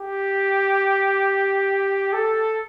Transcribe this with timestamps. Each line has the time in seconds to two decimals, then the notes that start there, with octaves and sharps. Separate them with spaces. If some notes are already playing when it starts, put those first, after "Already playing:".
Already playing: G4
2.13 A4